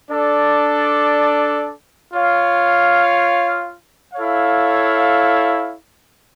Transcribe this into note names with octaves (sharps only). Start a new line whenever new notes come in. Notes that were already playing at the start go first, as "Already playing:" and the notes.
D4 A4 D5
F4 C#5 F5
E4 A4 C#5 F5